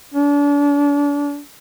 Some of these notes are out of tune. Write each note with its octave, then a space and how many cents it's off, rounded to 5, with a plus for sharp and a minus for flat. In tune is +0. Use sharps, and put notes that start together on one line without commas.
D4 -35